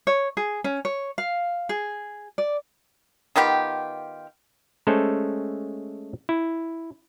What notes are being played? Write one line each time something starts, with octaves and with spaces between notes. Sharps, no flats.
C#5
G#4
C#4
C#5
F5
G#4
D5
D#3 B3 F4 G4
G#3 A3 C#4 A4 C5
E4